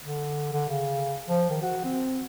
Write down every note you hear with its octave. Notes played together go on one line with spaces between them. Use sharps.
D3
D3
C#3
F3
D#3
F#4
C4